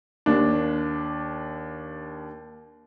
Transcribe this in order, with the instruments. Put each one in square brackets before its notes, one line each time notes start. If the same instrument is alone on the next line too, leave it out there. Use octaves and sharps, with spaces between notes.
[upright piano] D#2 D4